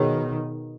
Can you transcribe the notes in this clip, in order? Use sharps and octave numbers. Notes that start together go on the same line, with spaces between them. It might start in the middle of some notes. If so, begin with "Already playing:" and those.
Already playing: B2 D#3 G#4 C#5